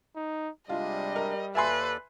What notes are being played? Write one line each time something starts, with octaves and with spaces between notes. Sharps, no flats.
D#4
C3 G3 G#3 D4 F4 D#5
A#4
D#2 A4 B4 D5 E5 G#5 C6